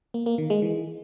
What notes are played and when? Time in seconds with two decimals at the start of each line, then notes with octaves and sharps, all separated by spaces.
0.14 A#3
0.26 A#3
0.38 D#3
0.50 G#3
0.62 E3